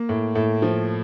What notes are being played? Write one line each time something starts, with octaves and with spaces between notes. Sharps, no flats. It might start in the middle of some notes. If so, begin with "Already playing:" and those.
Already playing: A#3
A2
A2
F3